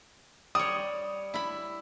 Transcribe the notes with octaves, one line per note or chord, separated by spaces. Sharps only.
G3 C#5 D#6
E4 B5